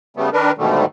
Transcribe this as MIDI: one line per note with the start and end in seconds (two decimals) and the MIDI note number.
0.17 0.30 49
0.17 0.30 55
0.17 0.30 57
0.17 0.30 59
0.33 0.52 51
0.33 0.52 62
0.33 0.52 70
0.33 0.52 71
0.58 0.85 44
0.58 0.85 47
0.58 0.85 50
0.58 0.85 51
0.58 0.85 55
0.58 0.85 57